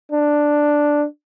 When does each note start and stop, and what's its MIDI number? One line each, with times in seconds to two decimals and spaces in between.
0.12 1.05 62